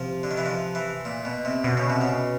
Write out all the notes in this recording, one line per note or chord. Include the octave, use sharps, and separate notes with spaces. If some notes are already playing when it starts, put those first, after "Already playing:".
Already playing: C3 F3
D3
D#3
E3
F3
E3
A#2
B2
C3
B2 D3
C#3
C3
C#3